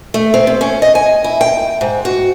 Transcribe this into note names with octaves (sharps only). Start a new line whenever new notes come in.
A3
C4
C3
C#4
D#5
G#5
E4
G5
G#2
F#4